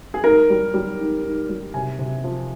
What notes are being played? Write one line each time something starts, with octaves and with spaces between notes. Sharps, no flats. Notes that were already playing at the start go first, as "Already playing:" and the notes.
G#4
G#2 A#4
G3
G3
G#2
G#2
G3
C3 G#5
C3
F3